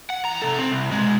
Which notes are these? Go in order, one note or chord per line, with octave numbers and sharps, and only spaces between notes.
F#5
E2 A#5
C3 A4
C4
C2
B2 G#3